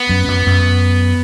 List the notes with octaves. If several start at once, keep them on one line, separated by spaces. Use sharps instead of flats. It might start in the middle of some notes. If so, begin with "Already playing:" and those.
Already playing: B3
F#2
F#2
F#2